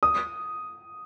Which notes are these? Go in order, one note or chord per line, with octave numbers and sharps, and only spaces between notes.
D#6